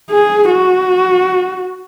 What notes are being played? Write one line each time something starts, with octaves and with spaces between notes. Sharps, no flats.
G#4
F#4